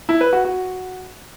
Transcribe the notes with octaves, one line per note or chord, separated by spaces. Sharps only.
E4
B4
F#4
F#4